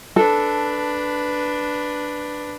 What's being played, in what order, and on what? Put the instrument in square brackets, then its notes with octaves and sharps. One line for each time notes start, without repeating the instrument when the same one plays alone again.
[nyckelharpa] D4 B4 [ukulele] A4